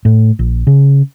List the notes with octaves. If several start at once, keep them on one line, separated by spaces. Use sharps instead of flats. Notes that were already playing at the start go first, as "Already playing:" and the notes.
A2
A#1
C#3